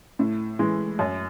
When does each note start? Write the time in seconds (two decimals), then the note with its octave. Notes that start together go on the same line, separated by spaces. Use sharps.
0.19 A2
0.59 E3 G#3
0.99 F#2